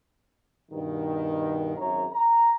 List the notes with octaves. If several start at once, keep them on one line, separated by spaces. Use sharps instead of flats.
G2 B2 D#3
G#1 F#2 C#5 A#5
A#5